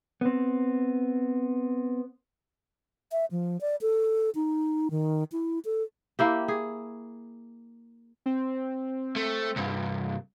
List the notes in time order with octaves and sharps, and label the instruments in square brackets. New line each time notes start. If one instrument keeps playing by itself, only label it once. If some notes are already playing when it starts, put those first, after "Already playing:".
[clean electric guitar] B3 C4
[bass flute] E5
F3
D5
A4
D#4
D#3
E4
A4
[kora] A#3 E4 G4
G#4
[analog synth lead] C4
[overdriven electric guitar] A3
C2 G2